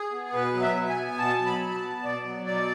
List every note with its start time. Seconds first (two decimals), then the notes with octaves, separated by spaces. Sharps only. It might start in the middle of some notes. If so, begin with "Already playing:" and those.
Already playing: G#4
0.11 B3
0.33 B2 B4
0.54 F#3
0.61 E5
0.76 B2
0.89 G#5
0.97 B3
1.18 B2 A5
1.39 F#3
1.46 B5
1.61 B2
1.75 A5
1.82 B3
2.03 B2 D5
2.25 F#3
2.46 B2 D5